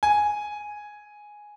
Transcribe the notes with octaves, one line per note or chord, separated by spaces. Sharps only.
G#5